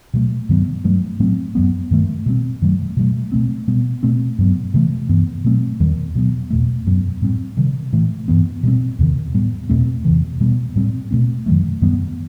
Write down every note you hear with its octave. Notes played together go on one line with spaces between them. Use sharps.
B2 F#3 A3
G2 D#3 F#3 B3
G2 F#3 A3
A2 F#3 A3 C4
F#2 F#3 B3
G2 D#3 A3
B2 G3 C4
F#2 D#3 F#3 A3
B2 F#3 A3
B2 A3 C4
B2 G3 B3
B2 A3 C4
G2 F#3 B3
C3 E3 A3
G2 E3 B3
B2 F#3 A3 C4
E2 D#3 G3
B2 F#3 B3
E2 B2 A3
F#2 F#3 B3
A2 G3 C4
C3 D#3 G3
A2 E3 A3
G2 E3 B3
B2 G3 C4
E2 C3 D#3
A2 G3 B3
E2 B2 A3 C4
E2 C3 E3
B2 G3 B3
A2 G3 C4
B2 A3 C4
F#2 D#3 F#3 A3
F#2 D#3 G3 B3